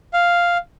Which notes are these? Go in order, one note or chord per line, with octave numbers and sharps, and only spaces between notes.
F5